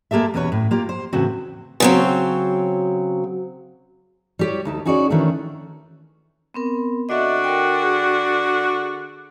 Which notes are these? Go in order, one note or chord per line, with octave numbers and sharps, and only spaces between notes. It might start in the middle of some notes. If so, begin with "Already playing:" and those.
G#3 A#3 G4 A4 E5
E2 B2 C#4 B4 C#5
A2
A#3 F4 G4
C5
E2 A2 C#3 C4 F#4
C#3 F#3 C4
G3 G4 C#5
D2 D#4 A5
C#4 D#4 F#4 G#4 C#5 D5
D#3 E3 A3 C#4 D4
B3 C4 A#4
D3 D4 F#4 D#5 E5
A#4 G5
G#4